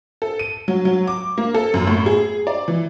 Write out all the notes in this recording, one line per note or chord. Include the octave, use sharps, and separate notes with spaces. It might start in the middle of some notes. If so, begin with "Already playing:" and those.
A4
D#7
F#3
F#3
D6
A#3
A4
F#2
A2
G#4
D5
E3